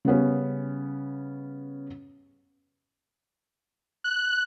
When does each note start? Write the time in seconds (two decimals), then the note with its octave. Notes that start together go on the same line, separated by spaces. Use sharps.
0.05 C#3 G3 B3 C#4
4.04 F#6